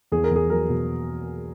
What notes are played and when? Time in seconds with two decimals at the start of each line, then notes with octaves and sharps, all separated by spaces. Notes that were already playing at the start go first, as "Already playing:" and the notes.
0.12 E2 G#4
0.24 A#4
0.31 E2 G#4
0.50 F#3 A#4
0.69 B2